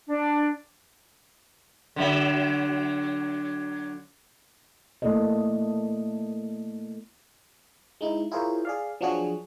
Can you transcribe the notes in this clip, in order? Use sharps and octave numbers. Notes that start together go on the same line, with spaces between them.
D4
D3 F#3 E5
A3 A#3 E4 A4 D5 D#5
G#3 D#4 E4
E4 F4 G#4 A#4 C5 C#5
G#4 D5 F5
F3 F#3 D4 F#4 G#4